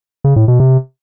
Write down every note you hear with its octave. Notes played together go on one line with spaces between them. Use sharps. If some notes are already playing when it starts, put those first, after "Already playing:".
C#3
A2
B2
C3